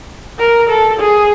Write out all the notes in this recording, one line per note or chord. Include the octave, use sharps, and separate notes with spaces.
A#4
A4
G#4